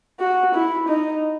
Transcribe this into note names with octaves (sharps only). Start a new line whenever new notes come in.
F#4
E4
D#4